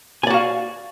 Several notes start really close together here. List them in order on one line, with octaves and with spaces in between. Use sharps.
G#5 D5 F#4 F5